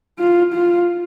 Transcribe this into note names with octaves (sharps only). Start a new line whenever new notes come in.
F4
F4